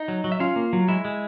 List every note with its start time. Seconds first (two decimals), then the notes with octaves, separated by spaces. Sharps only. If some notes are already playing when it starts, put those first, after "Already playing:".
Already playing: D#4 D#5
0.08 F#3
0.24 F#3
0.32 E5
0.40 C#4 F4 F5
0.56 A#3
0.73 F#3
0.88 G#3 E4 E5
1.05 G#3